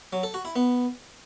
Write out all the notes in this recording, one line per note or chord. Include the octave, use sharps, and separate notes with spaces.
F#3
A4
F#4
E4
B3